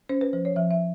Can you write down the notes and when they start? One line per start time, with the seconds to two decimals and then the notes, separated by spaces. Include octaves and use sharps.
0.09 C#4 C5
0.21 B4
0.33 F3 C5
0.45 C#5
0.56 F3 E5
0.71 E5